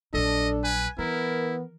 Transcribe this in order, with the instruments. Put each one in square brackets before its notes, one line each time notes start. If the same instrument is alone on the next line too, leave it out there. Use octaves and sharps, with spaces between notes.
[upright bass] A#1 F#3 [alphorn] D4 [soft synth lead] A4 [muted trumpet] D#5
[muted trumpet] B4 [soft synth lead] G#5
[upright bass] E3 [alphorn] B3 [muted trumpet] E4 [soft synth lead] A#4